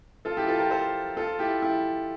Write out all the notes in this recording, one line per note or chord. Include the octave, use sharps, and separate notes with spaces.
F4 A4
E4 G4
F4 A4
G4 A#4
A4 C5
F4 A4
E4 G4
E4 G4